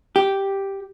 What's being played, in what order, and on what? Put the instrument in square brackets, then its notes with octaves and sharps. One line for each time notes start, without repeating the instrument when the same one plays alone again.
[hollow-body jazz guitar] G4